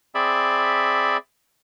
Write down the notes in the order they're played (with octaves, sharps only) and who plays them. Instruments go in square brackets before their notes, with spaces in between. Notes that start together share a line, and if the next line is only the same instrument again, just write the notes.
[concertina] C4 G#4 D5 E5 B5